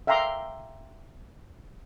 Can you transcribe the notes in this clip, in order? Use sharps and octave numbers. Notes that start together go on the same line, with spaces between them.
E5 F5 G5 A#5 C6 D6